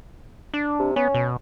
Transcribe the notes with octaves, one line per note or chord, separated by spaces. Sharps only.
D4
C3
B3 C#4
B2